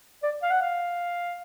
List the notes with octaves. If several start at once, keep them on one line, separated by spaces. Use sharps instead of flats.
D5
F5
F#5
F5